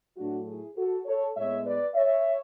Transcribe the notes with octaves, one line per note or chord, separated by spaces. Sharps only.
A2 F#3 A3 D4 F#4
E4 G#4
F#4 A4
A4 C#5
A2 G#3 B3 C#5 E5
B4 D5
C#5 E5